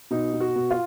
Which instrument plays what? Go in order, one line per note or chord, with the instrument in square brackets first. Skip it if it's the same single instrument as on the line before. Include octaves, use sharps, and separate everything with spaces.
[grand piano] B2 D#4
B2
F#4
B2
F4